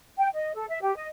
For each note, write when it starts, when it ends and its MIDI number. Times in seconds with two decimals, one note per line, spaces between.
0.18 0.28 79
0.33 0.55 75
0.55 0.65 69
0.69 0.80 76
0.81 0.94 67
0.96 1.07 75